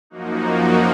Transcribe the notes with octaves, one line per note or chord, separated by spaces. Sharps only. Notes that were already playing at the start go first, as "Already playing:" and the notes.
F#2 F3 A#3 D#4 F#4